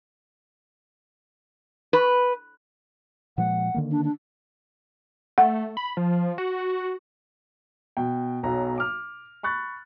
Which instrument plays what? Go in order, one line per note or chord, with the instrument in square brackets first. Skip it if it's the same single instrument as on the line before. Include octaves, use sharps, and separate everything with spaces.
[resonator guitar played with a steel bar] B4
[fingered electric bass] A#2 F3 G#3 [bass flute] F#5
[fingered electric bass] D3 D#3 A#3
[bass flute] D4
D4
[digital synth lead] A3 [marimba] F#5
[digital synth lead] B5
F3
F#4
[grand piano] B2 G5
B1 B2 F#3 A#5
D6 F6
B5 C#6 F#6 A6